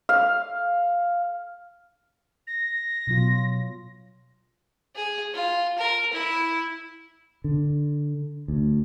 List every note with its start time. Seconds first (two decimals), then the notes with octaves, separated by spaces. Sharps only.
0.09 F5
2.47 A#6
3.07 B2 F#3 F4
4.95 G#4
5.34 F4
5.78 A#4
6.13 E4
7.44 D3
8.48 D2